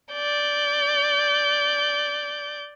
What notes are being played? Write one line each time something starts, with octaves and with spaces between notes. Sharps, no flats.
D5 G6